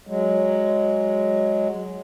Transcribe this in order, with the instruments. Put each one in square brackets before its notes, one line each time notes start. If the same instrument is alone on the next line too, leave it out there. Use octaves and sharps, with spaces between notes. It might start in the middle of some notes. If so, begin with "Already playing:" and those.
[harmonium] F#3 G#3